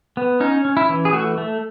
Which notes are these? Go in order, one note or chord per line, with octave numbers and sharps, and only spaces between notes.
B3
C#4 D#4
C#4
E4
E3
G#4
A3 F#4
A3